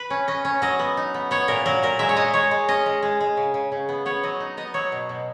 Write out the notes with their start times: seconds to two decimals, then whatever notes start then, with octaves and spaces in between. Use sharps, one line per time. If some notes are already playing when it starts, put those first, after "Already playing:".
Already playing: B4
0.10 C#4
0.28 C#4 D#5
0.45 C#4
0.62 F#3 D#5
0.79 B3
0.97 D#4
1.14 B3
1.31 B3 C#5
1.48 A#2 A#4
1.66 F#3 A#4
1.83 A#2 A#4
1.99 G#3 E5
2.09 C#5
2.16 G#3 D#5
2.33 G#3 C#5
2.51 G#3
2.68 C#4 D#5
2.86 G#3
3.02 G#3
3.21 G#3
3.37 C#3
3.54 C#3
3.72 C#3
3.88 B3
4.06 B3 C#5
4.23 F#3 D#5
4.40 D#4
4.57 B3 D#5
4.74 F#3 C#5
4.92 B2
5.09 B2